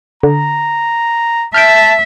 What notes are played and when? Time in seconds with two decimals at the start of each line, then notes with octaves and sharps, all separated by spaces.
0.23 D3 A#5
1.54 E5 A5 F6 G6 D7